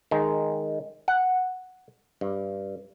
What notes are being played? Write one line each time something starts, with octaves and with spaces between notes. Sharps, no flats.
D#3 G#3
F#5
G2